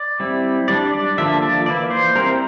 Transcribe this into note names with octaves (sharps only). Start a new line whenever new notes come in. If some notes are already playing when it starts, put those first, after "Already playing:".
Already playing: D5
G3 C4 E4
G3 D4 D5
D5
D3 F3 A#3 D4 E5
D5
E3 A#3 E4 D5
C5
G3 C4 E4 A#4